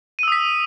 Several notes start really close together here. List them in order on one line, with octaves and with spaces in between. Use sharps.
D#7 E6 D#6 B6